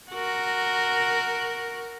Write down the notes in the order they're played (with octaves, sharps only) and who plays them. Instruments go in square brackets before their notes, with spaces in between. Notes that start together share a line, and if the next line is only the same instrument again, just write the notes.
[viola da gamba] F#4 A#4